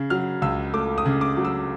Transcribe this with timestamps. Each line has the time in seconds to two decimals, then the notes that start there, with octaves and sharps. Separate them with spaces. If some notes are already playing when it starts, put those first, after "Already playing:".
Already playing: C#3
0.10 F#3 F6
0.42 C#2 E6
0.73 A3 D6
0.98 D#6
1.05 C#3
1.21 D6
1.37 F#3
1.45 E6